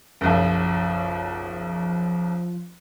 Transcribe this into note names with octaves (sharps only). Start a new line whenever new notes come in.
F#1 B1 F3